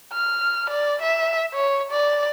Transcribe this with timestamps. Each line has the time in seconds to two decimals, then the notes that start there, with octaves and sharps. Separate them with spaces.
0.13 F6
0.70 D5
1.02 E5
1.53 C#5
1.91 D5